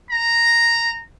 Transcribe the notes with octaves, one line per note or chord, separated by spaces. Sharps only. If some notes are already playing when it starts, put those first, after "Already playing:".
A#5